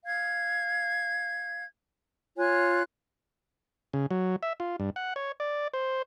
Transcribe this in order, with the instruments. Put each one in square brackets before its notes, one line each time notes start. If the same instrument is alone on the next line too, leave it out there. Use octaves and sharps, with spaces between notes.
[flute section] F5 G#6
F4 C#5 G#5 F#6
[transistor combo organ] C#3
F#3
E5
F4
G2
F#5
C#5
D5
C5